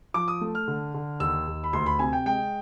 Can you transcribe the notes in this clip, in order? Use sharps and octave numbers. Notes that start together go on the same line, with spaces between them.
F3 D6
D#6
A3
F6
D3
D3
D#2 E6
D#2
B5
D2 C6
B5
C3 G#5
G5
G#3 G5